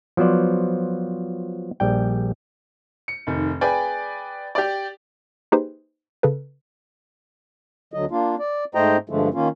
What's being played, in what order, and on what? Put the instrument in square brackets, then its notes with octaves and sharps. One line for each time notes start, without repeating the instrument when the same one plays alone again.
[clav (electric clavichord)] F3 F#3 B3 C5 D5
A#1 G3 G5
[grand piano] C#7
F1 D#3
G#4 B4 D5 G5 G#5
G4 D5
[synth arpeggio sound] A#3 D#4 G4 G#4 B4 C5
C#3 A4 B4
[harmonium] D2 D3 F#3 D#5
A#3 D4 F4
D5
G#2 A3 C5 D#5 G5 A#5
G2 D3 F3 G#3 A3
D#3 A#3 C#4 F4